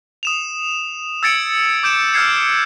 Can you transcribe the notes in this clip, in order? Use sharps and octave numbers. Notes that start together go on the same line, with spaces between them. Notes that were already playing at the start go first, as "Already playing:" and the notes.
D#6 E7 F7
E6 G#6 A6 C#7 D7
D6 G6 D7 E7
E6 F6 G6 G#6 C7 C#7